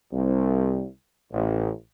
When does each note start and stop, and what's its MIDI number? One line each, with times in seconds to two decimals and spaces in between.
0.12 0.84 36
1.32 1.70 33